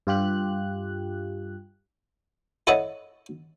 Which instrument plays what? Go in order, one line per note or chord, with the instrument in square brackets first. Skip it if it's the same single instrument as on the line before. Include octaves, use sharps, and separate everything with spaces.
[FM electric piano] G2 F4 G4 F#6
[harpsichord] E4 A4 C#5 D#5 F#5